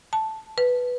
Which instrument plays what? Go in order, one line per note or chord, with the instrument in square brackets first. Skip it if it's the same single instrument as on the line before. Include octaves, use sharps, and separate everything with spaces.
[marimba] A5
B4